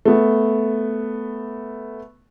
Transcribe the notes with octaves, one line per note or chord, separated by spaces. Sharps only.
A3 B3